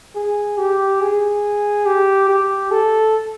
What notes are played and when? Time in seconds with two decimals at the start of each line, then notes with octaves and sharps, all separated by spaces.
0.15 G#4
0.58 G4
1.01 G#4
1.86 G4
2.29 G4
2.71 A4